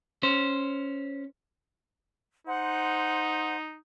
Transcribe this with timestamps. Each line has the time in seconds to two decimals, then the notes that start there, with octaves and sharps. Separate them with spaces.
0.23 C#4 C5
2.47 D#4 C5 F#5 C6